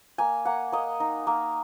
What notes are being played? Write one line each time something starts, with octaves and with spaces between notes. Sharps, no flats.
A#3 G#5
A#3 F#5
A#3 D#5
D#4
A#3